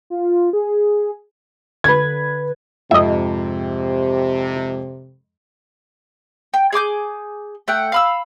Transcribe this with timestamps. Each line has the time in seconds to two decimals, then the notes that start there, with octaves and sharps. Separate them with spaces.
0.10 F4
0.53 G#4
1.84 D3 B4 B5 G#6
2.91 F2 G#2 C3 F3 D#5 E5
6.54 G5
6.73 G#4 G#5 D6 G6
7.68 A3 F#5 G5
7.92 F5 B5 E6